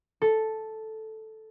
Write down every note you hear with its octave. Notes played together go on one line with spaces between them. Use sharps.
A4